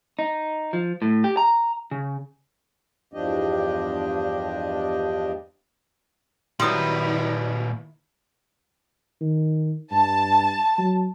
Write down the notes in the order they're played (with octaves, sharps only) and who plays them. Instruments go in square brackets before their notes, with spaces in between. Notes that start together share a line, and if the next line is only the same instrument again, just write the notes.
[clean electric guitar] D#4
F3
A2
G4
A#5
C#3
[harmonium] E2 G2 F3 D4 G4 D#5
[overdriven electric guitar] A#2 B4 [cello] D#3 E4 [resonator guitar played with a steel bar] F#3 G3 [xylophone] C6 D#6
[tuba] D#3
[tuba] G2 [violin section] A5
[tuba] F#3